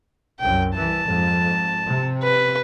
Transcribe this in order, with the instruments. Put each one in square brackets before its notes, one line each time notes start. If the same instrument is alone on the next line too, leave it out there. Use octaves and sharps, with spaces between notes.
[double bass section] C2 F#2 [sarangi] G5
[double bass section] C2 E3 [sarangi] A5
[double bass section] F2 G#2
C3
[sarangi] B4